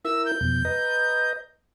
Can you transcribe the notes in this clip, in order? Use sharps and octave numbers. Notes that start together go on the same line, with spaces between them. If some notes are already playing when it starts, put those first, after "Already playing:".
E4 A#4 E6
G6
F2 B2
B4 D#5 A#5